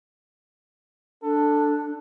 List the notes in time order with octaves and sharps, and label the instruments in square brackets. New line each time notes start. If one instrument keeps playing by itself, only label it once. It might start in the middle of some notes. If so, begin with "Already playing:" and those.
[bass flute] D4 [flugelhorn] A4